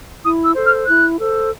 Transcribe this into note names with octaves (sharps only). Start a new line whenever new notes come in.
E4 D#6
E6
A4 C5
F6
E4 F#6
A4 C5